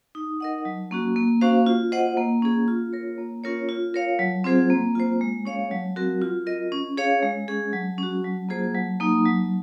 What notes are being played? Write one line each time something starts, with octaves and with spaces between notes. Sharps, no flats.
D#4
A#4 D#5 F#5
F#3
A#3 C#4 F#4
A#3
C#4 F#4 C5 F5
F4
C5 D#5 F#5
A#3
C#4 G#4
F4
A#4 C#5
A#3
C#4 F4 A#4 C#5
F4
A#4 C#5 F5
F#3
C4 F4 G#4 C5
A#3
F4 C5
G#3
C#4 G#4 C#5 F5
F#3
C4 F#4 A#4
F4
A#4 D#5
C#4
G#4 C#5 F5
G#3
C#4 G#4
F#3
C#4 F#4
F#3
A#3 F4 G#4 C5
F#3
A#3 D#4
F#3